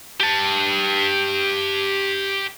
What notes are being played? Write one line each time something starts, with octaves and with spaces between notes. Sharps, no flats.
G4 A5